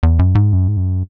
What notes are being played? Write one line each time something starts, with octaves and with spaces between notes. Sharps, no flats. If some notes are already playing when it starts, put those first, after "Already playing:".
E2
F#2
G#2
F#2
G#2
F#2